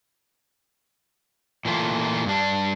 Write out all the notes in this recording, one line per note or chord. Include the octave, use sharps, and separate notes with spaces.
A#2 E3 A3 F4
G2 D4